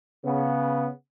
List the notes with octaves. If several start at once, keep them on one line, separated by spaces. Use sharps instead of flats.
C#3 B3